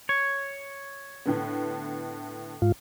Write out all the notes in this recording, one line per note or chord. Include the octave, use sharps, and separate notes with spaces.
C#5
A2 D3 B3
G#2 F4